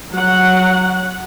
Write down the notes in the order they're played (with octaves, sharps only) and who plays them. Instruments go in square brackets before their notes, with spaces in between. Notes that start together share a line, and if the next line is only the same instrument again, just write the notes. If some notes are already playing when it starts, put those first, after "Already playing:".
[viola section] F#3 F#5